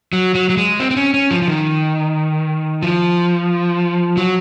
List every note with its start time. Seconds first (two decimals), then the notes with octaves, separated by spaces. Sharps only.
0.13 F#3
0.35 F#3
0.50 F#3
0.57 G#3
0.80 C4
0.91 C4
0.97 C#4
1.14 C#4
1.31 F3
1.42 F3
1.48 D#3
2.83 F3
4.17 F#3